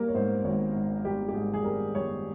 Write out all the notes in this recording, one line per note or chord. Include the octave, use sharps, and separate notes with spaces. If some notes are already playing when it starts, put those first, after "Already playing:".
Already playing: G3 A#3 A#4
C#5
G#2 C5
G#1 C#5
G#2
G3 G4
G4
G#2 G#4
G#4
G3 A#4
G3 C#5